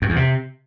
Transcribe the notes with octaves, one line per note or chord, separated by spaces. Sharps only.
F#2
E2
C3